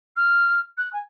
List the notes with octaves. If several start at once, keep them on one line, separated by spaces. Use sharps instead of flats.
F6
F#6
G#5